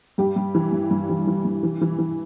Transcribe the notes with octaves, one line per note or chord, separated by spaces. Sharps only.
G2 G4
G2
E3
G2
G2
E3
E3
G2
E3
E3
E3